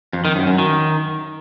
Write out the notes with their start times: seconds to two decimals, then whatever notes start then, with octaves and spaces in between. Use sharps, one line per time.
0.13 F2
0.25 D#3
0.36 F#2
0.47 F#2
0.58 D#3